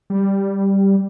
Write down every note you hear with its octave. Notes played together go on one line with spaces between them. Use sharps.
G3